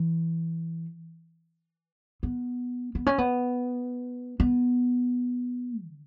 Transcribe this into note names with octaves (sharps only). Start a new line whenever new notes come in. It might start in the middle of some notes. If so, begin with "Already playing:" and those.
Already playing: E3
B3
B3
C#4
B3
B3
D3